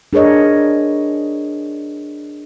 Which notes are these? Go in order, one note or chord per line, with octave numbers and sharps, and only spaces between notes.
D4 G#4 A#4 C#5 D#5